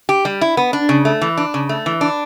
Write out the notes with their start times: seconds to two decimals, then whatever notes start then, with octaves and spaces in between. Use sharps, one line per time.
0.09 G4
0.25 G3
0.41 E4
0.57 B3
0.73 D4
0.89 C#3
1.05 A3
1.21 E3
1.38 D4
1.54 C#3
1.69 A3
1.86 E3
2.01 D4